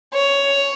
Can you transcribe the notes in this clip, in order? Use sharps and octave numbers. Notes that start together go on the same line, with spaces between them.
C#5